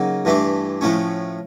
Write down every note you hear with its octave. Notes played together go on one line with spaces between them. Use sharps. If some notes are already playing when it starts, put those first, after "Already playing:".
Already playing: C#3 F#3 A#3 D#4
G2 E3 A3 D4
A2 F3 A3 C#4